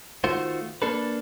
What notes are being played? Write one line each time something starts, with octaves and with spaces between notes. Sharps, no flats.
D#3 A3 F4 F#4 C5
A#3 D4 A4 B4